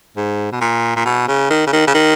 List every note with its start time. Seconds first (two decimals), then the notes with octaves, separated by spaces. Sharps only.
0.17 G#2
0.52 B2
0.61 A#2
0.96 A#2
1.05 B2
1.28 C#3
1.50 D#3
1.67 C#3
1.73 D#3
1.87 C#3
1.94 D#3